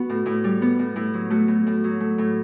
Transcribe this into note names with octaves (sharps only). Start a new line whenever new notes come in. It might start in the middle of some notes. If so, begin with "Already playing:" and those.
Already playing: B3 F#4
A2
A2 E4
G3
B3
A2
A2 E4
F#3
A3 F#4
A2
A2
F#3
A3
A2